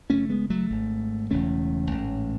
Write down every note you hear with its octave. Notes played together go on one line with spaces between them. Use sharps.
F#1 F#2 C#3 A3 C#4
G#3 B3
F#3 A3
G#1 G#2
E1 E2 C#3 A3 C#4
A1 G#2